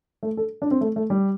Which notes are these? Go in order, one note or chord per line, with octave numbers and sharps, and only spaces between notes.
A3
A4
D4
C4
A3
A3
G3